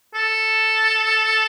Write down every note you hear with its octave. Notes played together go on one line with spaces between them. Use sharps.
A4